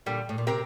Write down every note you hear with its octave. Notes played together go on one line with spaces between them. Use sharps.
A#2 D3 G3
A2
A#2
C3 C4 G4 A#4